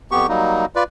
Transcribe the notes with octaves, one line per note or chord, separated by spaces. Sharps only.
F2 B3 G4 C#6
F#3 G3 A#3 D#4
F4 B4 D5